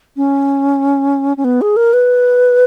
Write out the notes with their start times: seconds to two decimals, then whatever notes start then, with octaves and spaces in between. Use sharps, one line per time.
0.17 C#4
1.37 C#4
1.44 B3
1.61 G#4
1.76 A#4
1.93 B4